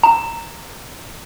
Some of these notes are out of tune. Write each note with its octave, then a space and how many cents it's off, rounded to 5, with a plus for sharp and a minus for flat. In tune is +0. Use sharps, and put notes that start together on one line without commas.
A#5 -15